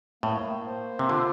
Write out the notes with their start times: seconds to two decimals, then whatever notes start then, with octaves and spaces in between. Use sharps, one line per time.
0.23 A2 A#3
0.66 C5
0.99 C3
1.09 D3 F4